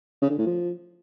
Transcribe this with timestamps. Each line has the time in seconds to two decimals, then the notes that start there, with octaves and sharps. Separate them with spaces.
0.22 C#3
0.30 D3
0.38 A2
0.46 F3